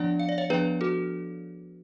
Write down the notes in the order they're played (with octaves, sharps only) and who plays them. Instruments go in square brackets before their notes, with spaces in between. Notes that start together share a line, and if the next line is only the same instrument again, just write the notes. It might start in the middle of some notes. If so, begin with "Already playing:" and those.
Already playing: [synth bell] F3 B3 D4 D5 F#5
F5
D5
C#5 F5
F3 B3 D4 G#4 B4
F#4 A4